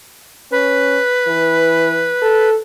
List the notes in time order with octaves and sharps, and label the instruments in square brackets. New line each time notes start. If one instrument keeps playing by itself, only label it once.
[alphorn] C#4 [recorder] B4
[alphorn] E3
A4